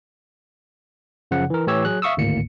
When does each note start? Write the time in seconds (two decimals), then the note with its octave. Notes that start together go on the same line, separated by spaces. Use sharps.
1.31 F#2 C#3 F3 F#5
1.50 E3 A#4
1.67 A2 E3 G4 C#5 E6
1.85 F#3 G#4 F#6
2.02 E5 F5 C#6 D#6 E6
2.17 G#1 D2 A2 A#3 C#7